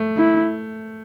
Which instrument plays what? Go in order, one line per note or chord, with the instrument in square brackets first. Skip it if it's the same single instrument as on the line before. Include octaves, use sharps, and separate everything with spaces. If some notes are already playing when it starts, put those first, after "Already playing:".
Already playing: [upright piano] A3
[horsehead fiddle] E4